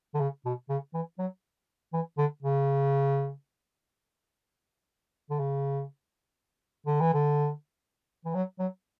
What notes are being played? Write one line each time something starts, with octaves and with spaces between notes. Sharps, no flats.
D3
C#3
B2
C#3
E3
F#3
E3
D3
C#3
D3
C#3
D3
E3
D3
E3
F#3
F#3